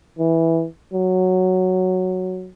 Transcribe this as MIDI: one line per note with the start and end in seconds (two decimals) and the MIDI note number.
0.18 0.66 52
0.93 2.50 54